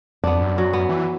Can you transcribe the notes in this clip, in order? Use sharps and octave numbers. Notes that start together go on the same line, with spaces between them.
F2 B3 D4
F#2
F#3
B3
E3